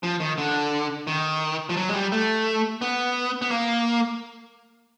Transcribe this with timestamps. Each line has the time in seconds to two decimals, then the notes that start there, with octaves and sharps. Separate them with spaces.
0.03 F3
0.20 D#3
0.38 D3
1.07 D#3
1.69 F3
1.77 F#3
1.89 G#3
1.94 G3
2.12 A3
2.82 B3
3.42 B3
3.51 A#3